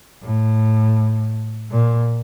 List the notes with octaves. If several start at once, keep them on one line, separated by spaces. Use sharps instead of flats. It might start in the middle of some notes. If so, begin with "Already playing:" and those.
A2
A#2